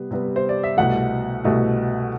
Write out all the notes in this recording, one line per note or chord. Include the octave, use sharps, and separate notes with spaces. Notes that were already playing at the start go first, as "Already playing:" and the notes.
Already playing: C3 G3 B3
C3 G3 B3
C5
D5
E5
C2 B2 A3 F#5
C2 B2 A3